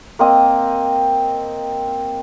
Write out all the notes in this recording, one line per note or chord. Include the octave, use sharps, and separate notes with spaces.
A#3 C4 D#5